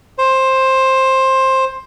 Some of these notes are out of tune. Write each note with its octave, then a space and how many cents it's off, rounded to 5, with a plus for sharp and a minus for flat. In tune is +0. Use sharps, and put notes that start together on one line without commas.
C5 +15